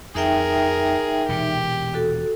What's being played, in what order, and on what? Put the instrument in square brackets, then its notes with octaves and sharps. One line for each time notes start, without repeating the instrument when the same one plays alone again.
[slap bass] F2 [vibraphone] D#4 E5 G5 [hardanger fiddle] G#4 A#4
[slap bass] E1 E2 A#2 [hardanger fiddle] G4
[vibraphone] F#4 A4